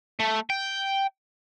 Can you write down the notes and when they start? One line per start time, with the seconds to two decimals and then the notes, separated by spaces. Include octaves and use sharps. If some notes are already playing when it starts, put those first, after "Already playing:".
0.20 A3
0.50 G5